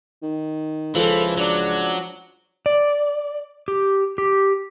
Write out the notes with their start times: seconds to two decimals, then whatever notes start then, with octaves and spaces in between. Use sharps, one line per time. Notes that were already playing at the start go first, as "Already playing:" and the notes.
0.22 D#3
0.95 C#2 E3 F3 A4
1.37 F#3 D4
2.66 D5
3.68 G4
4.18 G4